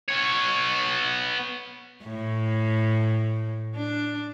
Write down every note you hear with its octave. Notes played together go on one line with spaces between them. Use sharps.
B3 C#5
A2
D4